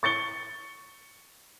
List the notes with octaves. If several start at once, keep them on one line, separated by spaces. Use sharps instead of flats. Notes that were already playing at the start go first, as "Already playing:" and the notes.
C#6 A6 C#7 G7